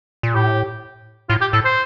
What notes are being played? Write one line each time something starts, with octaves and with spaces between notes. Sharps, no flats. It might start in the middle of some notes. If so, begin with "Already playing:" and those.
A#2
A2 G4
A2 F4
G4
A2 A4
C5